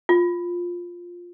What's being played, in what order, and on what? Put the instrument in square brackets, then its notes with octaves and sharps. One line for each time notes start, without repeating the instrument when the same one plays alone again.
[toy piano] F4